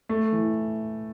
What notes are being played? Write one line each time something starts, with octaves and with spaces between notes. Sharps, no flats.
A3
E3